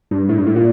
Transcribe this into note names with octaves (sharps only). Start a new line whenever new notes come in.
G2
A2
G2
A2
A#2